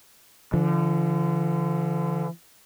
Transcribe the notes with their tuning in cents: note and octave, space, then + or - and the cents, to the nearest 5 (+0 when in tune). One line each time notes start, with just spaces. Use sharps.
D3 -5 F3 -45